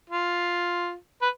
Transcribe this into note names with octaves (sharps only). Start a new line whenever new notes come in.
F4
B4